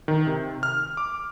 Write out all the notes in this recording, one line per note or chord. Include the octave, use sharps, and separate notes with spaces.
D#3
C3
F6
D6